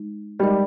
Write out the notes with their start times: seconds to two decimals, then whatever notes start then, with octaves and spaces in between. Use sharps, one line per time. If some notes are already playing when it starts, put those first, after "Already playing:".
Already playing: G#3 D#4
0.40 G3 G#3 D#4 A#4 D#5